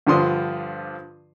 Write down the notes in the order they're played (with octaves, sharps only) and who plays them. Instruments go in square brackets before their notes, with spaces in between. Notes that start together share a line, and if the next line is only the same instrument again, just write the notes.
[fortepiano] G2 D3 F3 C6 D#6